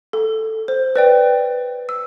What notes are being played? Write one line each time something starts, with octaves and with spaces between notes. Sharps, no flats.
A4
C5
B4 D5 G5
E6